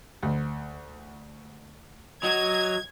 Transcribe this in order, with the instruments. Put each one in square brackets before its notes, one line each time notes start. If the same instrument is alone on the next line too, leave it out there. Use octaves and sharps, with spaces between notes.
[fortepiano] D2
[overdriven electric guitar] F#3 [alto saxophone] D#5 [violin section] G#6